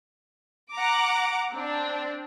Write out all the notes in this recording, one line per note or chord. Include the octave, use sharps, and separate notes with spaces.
F#5 A#5 D6
C4 D4